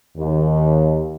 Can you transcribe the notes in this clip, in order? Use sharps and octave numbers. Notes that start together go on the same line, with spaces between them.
D#2